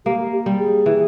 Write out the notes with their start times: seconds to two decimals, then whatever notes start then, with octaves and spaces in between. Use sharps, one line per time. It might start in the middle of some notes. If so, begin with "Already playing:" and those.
0.06 A#3 G4
0.33 G4
0.46 G3
0.58 G#4
0.86 E3